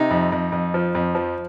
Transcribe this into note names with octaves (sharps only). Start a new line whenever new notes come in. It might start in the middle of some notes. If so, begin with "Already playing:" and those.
Already playing: C3 D#4
F2
F2
F2
F3
F2
F3